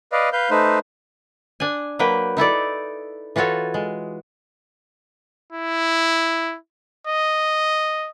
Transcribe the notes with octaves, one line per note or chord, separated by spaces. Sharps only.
B4 D5 D#5 F5
B4 F5 G6
A3 D#4 B4 C5
D4 G#5
F#3 A#3 B4 G5
D#4 E4 A4 D5
E3 F4 F#4 A4 C#5
G#3
E4
D#5